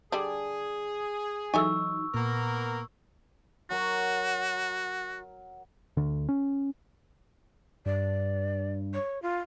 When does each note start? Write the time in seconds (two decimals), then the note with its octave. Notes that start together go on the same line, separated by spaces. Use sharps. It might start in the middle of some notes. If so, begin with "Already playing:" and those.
0.12 D3 G3 D4 G#4
1.54 E3 F#3 D#4 A4 E5 G#5 C#6 E6
2.14 A#2 A#3 B3 A#4
3.70 F#3 F#4 A#4
5.97 D2 D3
6.29 C#4
7.86 G2 D5
8.94 C#5
9.22 F4